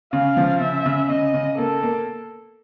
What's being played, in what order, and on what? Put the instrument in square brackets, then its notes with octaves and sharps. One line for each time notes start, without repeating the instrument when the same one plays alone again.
[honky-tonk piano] C#3 [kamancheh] F5
[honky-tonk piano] F3
[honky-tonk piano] C#3 [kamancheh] E5
[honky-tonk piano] C#3
[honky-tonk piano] C#3 [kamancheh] D#5
[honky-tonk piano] C#3
[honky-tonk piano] A#3 [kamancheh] A4
[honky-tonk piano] A#3